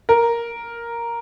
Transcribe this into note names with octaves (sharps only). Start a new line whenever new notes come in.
A#4